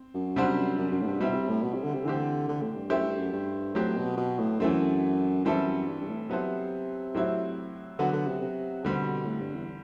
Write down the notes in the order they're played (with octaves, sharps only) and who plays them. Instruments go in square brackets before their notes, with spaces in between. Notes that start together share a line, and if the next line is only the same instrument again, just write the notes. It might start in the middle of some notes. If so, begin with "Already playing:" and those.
Already playing: [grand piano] C4
[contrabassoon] F#2
[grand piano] C3 G3 D4 F#4 C5
[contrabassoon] F#2
F#2
A2
G2
[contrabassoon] B2 [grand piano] G3 C4 E4
[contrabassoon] C3
A2
B2
C3
D3
C3
[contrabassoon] D3 [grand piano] E3 A3 C4 G4
[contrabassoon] D3
A2
G2
[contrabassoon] F#2 [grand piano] A3 E4 G4 C5
[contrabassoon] G2
F#2
G2
[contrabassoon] A2 [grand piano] F#3 C4 G4
[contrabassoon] B2
B2
A2
[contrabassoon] F#2 [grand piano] E3 A3 C4
[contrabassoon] F#2 [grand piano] E3 G3 C4 E4 A4
[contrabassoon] G2
G2
A2
[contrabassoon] C3 [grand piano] F#3 B3 E4 A4 C5
[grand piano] A2 F#3 C4 E4
[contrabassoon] D3 [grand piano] F#3 B3 F#4
[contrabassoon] D3
C3
C3
[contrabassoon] B2 [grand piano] D3 G3 C4
[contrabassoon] A2
G2
E2